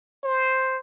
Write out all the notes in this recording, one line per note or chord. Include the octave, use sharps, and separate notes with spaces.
C5